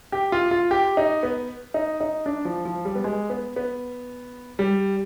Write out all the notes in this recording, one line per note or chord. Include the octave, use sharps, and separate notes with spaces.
G4
F4
F4
G4
D#4
B3
D#4
D#4
D4
F3
F3
G3
B3
G#3
B3
B3
G3